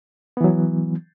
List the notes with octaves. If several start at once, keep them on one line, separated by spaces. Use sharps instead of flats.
E3 F#3 B3